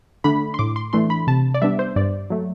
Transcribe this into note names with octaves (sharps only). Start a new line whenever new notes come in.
D3 A3 D4 B5
C6
A2 D6
C6
E3 A3 D4 C6
B5
C3 A5
D5
G3 B3 D4 E5
C5
G2 D5
F#3 A3